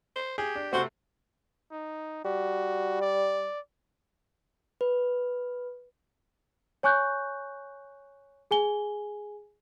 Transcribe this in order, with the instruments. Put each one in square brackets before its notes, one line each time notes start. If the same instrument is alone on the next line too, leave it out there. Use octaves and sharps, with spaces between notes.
[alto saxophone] C5
[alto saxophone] G4 [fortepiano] G#4
[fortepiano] D4
[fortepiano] C3 A3 [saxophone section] F#4 C5
[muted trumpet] D#4
[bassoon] G3 [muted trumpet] F#4
[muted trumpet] D5
[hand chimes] B4
[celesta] C#5 G#5 C#6 F#6 G6
G#4 G#5 G7